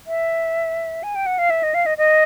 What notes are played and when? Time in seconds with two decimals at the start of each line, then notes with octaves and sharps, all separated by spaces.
0.07 E5
1.03 G#5
1.15 G5
1.26 F#5
1.38 F5
1.50 E5
1.63 D#5
1.74 F5
1.86 D#5
1.98 D#5